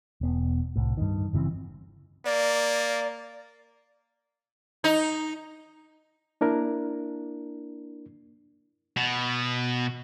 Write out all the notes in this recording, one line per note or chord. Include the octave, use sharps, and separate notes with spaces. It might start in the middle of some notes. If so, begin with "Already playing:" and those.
E1 B3
C2 A2
G2 D#3
G1 C#3 E3 C4
A#3 D5
D#4
A#3 D4 E4 A#4
B2